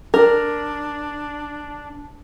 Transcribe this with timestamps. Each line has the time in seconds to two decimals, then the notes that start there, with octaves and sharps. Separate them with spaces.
0.14 D4 A#4